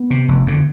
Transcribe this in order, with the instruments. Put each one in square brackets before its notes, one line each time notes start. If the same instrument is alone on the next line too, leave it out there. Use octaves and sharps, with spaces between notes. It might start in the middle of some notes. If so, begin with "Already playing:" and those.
Already playing: [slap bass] B3
C3
F1
F2 D3